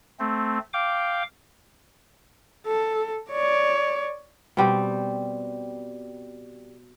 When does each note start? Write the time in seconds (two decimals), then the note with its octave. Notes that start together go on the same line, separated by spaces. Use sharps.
0.19 A3 C4
0.73 F5 G5 D6
2.67 A4
3.31 C#5 D5
4.57 B2 G3 C4